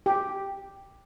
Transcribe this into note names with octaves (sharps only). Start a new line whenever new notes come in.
G4